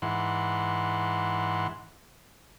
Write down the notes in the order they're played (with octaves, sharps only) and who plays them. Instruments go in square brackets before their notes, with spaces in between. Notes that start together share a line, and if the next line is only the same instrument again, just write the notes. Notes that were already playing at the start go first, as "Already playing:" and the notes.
[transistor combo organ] G#2 E3 F#5 C6